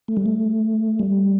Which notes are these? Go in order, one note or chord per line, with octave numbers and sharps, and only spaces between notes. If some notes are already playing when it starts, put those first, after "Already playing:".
A3
G3
A3
G3